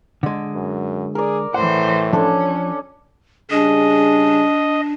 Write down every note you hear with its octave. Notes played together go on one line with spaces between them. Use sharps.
D3 G#3
F#2
G#4 A#4 D5
A2 E3 C5 F#5
F3 C#4 D4 A4
C#3 G3 D4 G#4 D#5